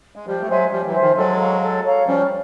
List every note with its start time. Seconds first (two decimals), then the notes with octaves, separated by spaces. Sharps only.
0.16 G#3
0.26 F3 G3 G4
0.41 A3
0.48 F#3 G#3 C5 E5 G#5
0.71 F3 G3 G4
0.86 E3 F#3
0.93 C5 E5 G#5
1.01 D#3 F3
1.16 F#3 G#3 A4
1.39 C#5 F5 A#5
1.62 A4
1.85 C#5 F5 A#5
2.06 F3 G3 C#4